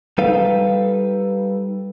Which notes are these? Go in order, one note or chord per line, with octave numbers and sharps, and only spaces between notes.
G3 D#4 A4 B4 F5